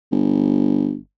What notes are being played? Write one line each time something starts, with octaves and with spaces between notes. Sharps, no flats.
G1